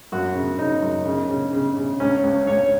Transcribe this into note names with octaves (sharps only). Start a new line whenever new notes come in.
F#2 F#4
C#3
C#3 D#4
F#2
C#3
C#3
C#3
C#3
C#2 C#4
C#2
C#2 C#5